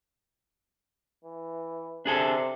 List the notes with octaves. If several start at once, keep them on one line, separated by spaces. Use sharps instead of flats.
E3
C3 D4 G#4 A4